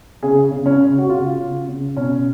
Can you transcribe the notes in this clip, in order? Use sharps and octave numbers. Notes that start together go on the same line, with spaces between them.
C#3 G#4
C#3
C#4
C#3
F#4
C#3 F4
C#3
C#3
B2 C#4